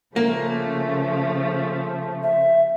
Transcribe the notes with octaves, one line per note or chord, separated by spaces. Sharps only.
C#3 F3 A3 A#3
E5